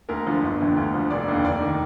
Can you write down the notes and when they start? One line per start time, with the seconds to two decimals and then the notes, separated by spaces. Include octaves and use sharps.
0.09 D2 A#4
0.26 D3 F3
0.43 G1
0.61 F2 D3
0.76 D2
0.94 D3 F3
1.10 F1 D5
1.28 D#2 D3
1.45 F1 D5
1.62 D#3